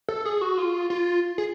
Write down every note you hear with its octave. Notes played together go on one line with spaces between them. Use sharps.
A4
G#4
F#4
F4
F4
G#4